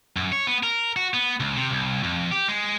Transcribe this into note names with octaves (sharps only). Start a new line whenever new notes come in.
F#2
C#5
B3
A#4
F#4
B3
C#2
C3
C2
F2
G4
G#3